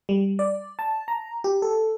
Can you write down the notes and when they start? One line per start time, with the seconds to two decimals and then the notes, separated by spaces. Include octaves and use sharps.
0.09 G3
0.39 D5
0.79 A5
1.08 A#5
1.44 G4
1.62 A4